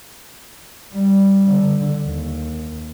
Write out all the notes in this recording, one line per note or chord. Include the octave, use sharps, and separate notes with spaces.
G3
D3
D#2